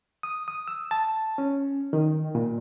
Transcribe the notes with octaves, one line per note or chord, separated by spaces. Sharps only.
D#6
D#6
E6
A5
C#4
D#3
A#2